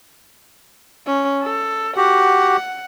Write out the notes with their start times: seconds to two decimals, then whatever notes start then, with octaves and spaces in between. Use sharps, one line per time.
1.07 C#4
1.43 A4
1.97 F#4 G4 F#5